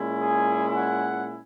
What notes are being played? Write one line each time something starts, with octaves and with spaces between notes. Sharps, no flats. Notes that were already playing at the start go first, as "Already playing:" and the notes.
Already playing: A#2 G#3 C#4 E4
G#4
F#5